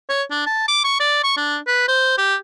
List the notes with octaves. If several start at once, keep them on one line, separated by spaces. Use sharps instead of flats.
C#5
D4
A5
D6
C#6
D5
C#6
D4
B4
C5
G4